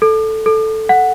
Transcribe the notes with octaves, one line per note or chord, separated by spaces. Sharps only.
A4
A4
F#5